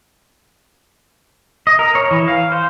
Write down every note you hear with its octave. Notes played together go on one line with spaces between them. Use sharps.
D#5
A#4
C#5
E3
F5
C5